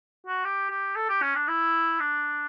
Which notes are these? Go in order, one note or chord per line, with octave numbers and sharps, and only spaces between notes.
F#4
G4
G4
A4
G4
C#4
D4
E4
D4